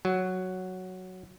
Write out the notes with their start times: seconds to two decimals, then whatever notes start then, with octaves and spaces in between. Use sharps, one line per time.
0.05 F#3